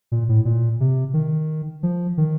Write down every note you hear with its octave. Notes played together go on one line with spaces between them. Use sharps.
A#2
A2
A#2
C3
D#3
F3
D#3